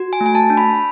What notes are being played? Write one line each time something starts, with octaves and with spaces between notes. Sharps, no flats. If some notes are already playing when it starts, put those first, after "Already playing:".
Already playing: F#4
G#5
A3
G#5
A5
D4
B5